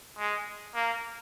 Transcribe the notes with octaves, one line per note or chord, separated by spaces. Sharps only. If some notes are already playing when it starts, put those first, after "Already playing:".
G#3
A#3